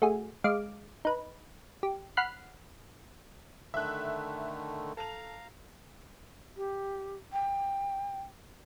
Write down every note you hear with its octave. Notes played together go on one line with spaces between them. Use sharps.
A3 F#4 G#4
G#3 F5 D6
D#4 B4
G4
F#5 B5 F6 F#6 C7
D3 D#3 A3 E5 F#6
A4 F5 A#5 F7
G4
G5